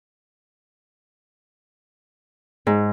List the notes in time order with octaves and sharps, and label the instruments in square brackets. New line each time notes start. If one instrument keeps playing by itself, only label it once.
[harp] G#2